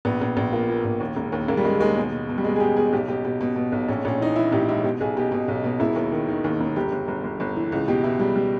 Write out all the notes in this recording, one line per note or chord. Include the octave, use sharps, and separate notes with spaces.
A#1 B3
A#1
A#1
A#2 A#3
A#2
A#1
D#2
E1
D#2
E1 A#3
G3
E1 G#3
D#2 G#3
B2
B2
B2
G3
B2 G#3
G#4
B2 G4
B2 G#4
B1 G4
B2 G4
B2 G4
B2
B2
B1
A#1 C#4
A#1 C#4
E3 D#4
E3 E4
A#1 G4
G#2 E4
B2 G4
B1 G#4
B2 G4
B2
B1
B2
E1 E4
D#2
D#3
D#3
D#2
E1
G1 G4
G1
G1
G1
G1
E3
C#2
B2 G4
B2 E4
C#2 G3
G3